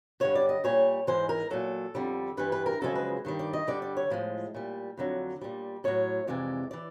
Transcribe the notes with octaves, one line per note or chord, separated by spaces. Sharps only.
G2 D3 G3 C#5
D5
D#5
A#2 G3 C#5
G#2 E3 G#3 C5
A#4
A#2 F#3 A4
F2 D3 G3
G2 E3 G3 B4
B4
A#4
F#2 C#3 F3 G#3 A4
B4
G2 D#3 G3
D5
D#5
G2 D3 G3 D5
D5
C#5
A2 F3 G#3
A#2 G3
F2 D3 F#3
A#2 G3
A2 F#3 C#5
F2 C3 E3 G#3 D5
E3 D5